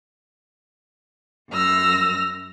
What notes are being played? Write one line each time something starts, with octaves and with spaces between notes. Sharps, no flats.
F#2 E6 F6 A#6